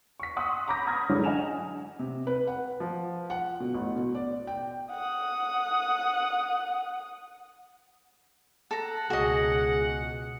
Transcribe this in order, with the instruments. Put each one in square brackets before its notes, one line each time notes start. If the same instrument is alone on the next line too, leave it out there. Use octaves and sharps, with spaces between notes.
[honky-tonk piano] C#6 B6
F#5 C6 C#6 D#6 E6
A#5 B5 D6 G6 A#6
A#5 B5 D#6 F6 G#6
D3 E3 F#3 G#3 C#4 D4
D#5 F#5 G#5 E7 F7
[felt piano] C3
B4
F#5
F3
F#5
B2
A1
B2
D5
G5
[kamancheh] F#5 D#6
[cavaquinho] A4 A#5 [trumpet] F#5
[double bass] C#2 B2 [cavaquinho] F#4 D#5 [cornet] G#4